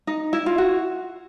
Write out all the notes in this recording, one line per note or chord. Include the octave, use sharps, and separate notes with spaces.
D#4
E4
F4
F#4